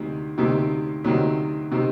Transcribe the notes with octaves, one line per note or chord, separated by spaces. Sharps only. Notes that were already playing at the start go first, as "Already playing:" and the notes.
Already playing: D2 C3 D#3
D2 C3 D#3
D2 C3 D#3 F#3
C3 D#3